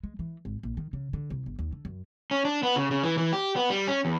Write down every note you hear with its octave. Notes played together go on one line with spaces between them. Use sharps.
G#3
E3
G#1
A#1
D#3
C#3
D3
C2
G1
D#2
D3
F#2
C#4
D4
B3
C#3
C#3
E3
E3
G4
B3
G3
C#4
E2